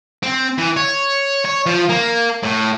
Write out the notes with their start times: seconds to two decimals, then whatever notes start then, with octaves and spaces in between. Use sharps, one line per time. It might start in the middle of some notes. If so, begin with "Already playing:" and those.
0.23 C4
0.58 E3
0.77 C#5
1.45 C#5
1.66 F3
1.89 A#3
2.43 A2